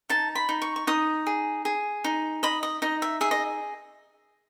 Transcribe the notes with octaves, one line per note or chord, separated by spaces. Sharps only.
D#4 A5
B5
D#4
C#6
C#6
D#4 D#6
G#4
G#4
D#4
D#5 B5
D#5
D#4 D#5
E5
G#4 E5
D#5